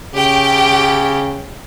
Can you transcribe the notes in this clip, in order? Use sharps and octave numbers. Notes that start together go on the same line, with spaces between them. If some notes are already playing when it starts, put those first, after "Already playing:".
C#3 G4 G5